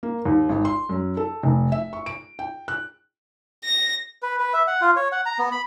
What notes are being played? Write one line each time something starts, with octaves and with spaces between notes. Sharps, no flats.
A#3
D#2
G#1
C6
F#2
A4
F1
E5
C#6
D7
G5
F#6
A#6
B4
B4
E5
F#5
F4
C#5
F#5
A#5
B3
B5